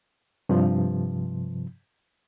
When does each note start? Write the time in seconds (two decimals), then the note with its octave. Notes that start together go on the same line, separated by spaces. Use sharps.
0.49 G2 C3 F3